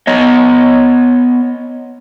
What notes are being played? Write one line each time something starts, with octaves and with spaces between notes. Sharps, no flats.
B3 C#5 D#5